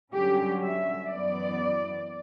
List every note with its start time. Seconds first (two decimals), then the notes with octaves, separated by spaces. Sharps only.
0.12 G2 D3 F#3 C#4 G4
0.61 E5
1.10 F#2 E3 B3 D5